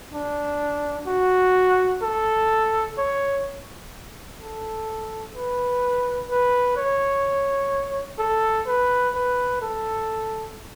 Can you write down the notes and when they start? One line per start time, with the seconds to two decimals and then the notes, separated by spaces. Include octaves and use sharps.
0.13 D4
1.08 F#4
2.02 A4
2.98 C#5
4.41 A4
5.35 B4
6.29 B4
6.77 C#5
8.19 A4
8.67 B4
9.14 B4
9.62 A4